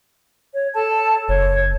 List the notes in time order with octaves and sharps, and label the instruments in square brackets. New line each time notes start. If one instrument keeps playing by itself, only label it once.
[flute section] C#5
A4 A5
[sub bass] F#1 [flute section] C#5